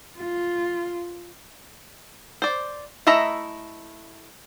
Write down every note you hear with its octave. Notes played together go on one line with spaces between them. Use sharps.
F4
C5 D5
A3 E4 D#5 E5 A#5